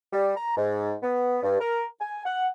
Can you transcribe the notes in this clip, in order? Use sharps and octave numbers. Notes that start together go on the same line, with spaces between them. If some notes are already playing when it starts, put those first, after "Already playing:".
G3
A#5
G#2
B3
G2
A#4
G#5
F#5